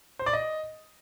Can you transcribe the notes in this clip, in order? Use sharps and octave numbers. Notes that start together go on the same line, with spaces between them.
C5
D5
D#5